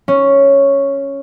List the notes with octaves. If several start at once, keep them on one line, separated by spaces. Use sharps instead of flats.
C#4